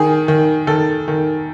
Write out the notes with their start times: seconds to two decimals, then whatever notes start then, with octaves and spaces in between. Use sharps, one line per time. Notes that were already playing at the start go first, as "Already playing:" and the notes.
Already playing: D#3 G#4
0.28 D#3
0.67 D#3 A4
1.08 D#3